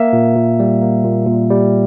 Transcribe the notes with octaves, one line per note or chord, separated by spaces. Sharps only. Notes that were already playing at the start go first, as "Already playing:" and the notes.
Already playing: A#3 E5
A#2
A#2
G3
A#3
A#2
A#2
G3